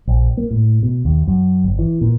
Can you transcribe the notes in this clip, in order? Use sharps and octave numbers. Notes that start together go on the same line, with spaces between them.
A#1
A#3
A2
B2
D#2
F#2
G1
E3
A#2